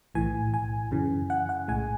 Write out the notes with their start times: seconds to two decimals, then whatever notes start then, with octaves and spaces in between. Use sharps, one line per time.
0.15 B1 A2 E3 G#5
0.54 G#5
0.91 F#2 C#3 E3
1.30 F#5
1.49 F#5
1.68 B1 A2 G#3 G#5